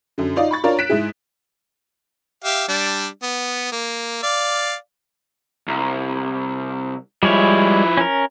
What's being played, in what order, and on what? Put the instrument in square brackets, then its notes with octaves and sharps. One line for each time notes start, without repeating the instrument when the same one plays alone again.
[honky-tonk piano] F#2 D3
D#4 F4 D5 D#5 F5
B5 C#6 A6
D4 F4 A#4 C#5 D5
F#6 B6 D7 E7
G#2 E4 G#4
[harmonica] G4 E5 F5
G3 D4
B3
A#3
D5 F5
[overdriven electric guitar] C2
[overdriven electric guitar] F3 E4 [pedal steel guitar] G3 G#3 C#5
[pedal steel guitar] C#4 A#4